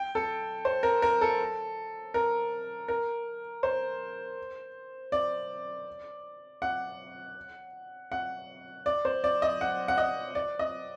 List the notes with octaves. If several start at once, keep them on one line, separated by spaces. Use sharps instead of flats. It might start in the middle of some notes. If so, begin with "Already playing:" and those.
Already playing: G5
A4
C5
A#4
A#4
A4
A#4
A#4
C5
D5
F#5
F#5
D5
C5
D5
D#5
F#5
F#5
D#5
D5
D#5